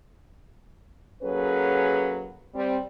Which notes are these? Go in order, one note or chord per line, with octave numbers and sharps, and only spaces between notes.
F#3 A#3 C#4 G#4 A4 B4
G3 C4